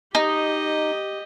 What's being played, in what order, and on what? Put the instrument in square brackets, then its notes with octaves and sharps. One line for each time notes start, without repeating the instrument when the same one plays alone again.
[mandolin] D#4 [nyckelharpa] G4 D#5